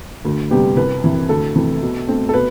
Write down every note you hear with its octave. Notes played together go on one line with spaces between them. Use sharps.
D2
C3 G3 B3 G4
C2 B4
C3 E3
D2 A4
C3 E3 A3
B2
A3 C4
A4
B2 B4